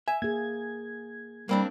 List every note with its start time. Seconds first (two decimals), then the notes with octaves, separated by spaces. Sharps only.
0.08 E5 G#5
0.22 A#3 G#4 G#6
1.49 G3 A#3 C4 D4